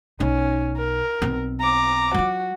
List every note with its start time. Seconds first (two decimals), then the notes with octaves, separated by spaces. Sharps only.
0.20 B1 C#4 D#4
0.77 A#4
1.22 B1 C4
1.60 A#5 D6
2.14 F#3 F4 F#4